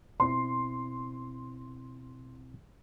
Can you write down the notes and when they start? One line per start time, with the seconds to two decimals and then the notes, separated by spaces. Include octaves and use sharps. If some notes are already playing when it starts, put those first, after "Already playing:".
0.20 B2 C4 E4 C6